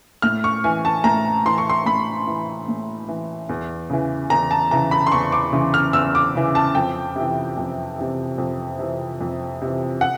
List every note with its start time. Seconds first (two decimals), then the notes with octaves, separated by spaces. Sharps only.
0.22 A2 F6
0.44 C#6
0.64 E3 G#5
0.85 A5
1.04 A2 A#5
1.46 E3 C6
1.58 C#6
1.70 C6
1.86 A2 B5
2.27 E3
2.68 A2
3.08 E3
3.49 E2
3.90 C#3 E3
4.30 E2 A#5
4.51 A5
4.71 C#3 E3 A#5
4.91 B5
5.07 C6
5.12 E2 C#6
5.32 D6
5.53 C#3 E3
5.74 F6
5.93 E2 E6
6.15 D6
6.35 C#3 E3
6.55 A5
6.75 F2 G5
7.16 C3 E3
7.57 F2
7.98 C3 E3
8.38 F2
8.79 C3 E3
9.21 F2
9.62 C3 E3
10.01 F#5